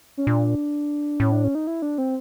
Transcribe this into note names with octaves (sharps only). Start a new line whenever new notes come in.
C#4
A#2 D4
A2 C#4
D4
C#4
D#4
E4
D4
C4